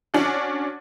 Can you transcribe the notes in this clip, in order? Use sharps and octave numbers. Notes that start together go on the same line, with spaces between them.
C#4 D4 F#4